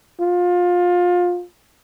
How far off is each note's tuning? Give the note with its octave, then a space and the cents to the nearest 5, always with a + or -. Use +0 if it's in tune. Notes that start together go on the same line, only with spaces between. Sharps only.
F4 +25